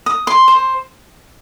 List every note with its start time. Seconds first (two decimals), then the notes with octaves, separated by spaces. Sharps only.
0.06 D#6
0.27 C6
0.48 C5